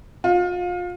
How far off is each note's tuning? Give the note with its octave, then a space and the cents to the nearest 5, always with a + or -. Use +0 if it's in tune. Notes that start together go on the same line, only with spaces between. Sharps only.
F4 +30